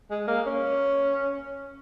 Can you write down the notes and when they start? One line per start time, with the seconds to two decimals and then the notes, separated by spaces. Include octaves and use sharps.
0.11 G#3
0.27 A#3
0.46 C#4